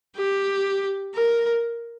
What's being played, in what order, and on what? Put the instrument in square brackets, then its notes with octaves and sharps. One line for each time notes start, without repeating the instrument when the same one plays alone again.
[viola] G4
A#4